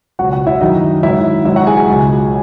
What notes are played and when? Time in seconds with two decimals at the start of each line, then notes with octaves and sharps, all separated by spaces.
0.19 C#2 B2 F#3 F#4 F#5
0.33 F#4 F#5
0.46 E4 E5
0.60 F#2 D#3 F#3 D#4 D#5
1.03 G#2 D#3 F#3 E4 E5
1.45 G#2 F#3 E4 E5
1.56 F#4 F#5
1.67 G#4 G#5
1.77 G#4 G#5
1.88 C#2 B2 F#3